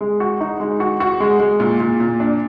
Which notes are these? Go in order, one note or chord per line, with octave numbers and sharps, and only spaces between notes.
G#3
F#4
D#4
G#3
F#4
F#4
G#3
G#3
A#2
A#2
A#2
D4